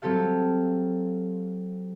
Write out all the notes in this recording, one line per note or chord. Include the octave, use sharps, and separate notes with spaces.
F#3 C4 G4 A4 F5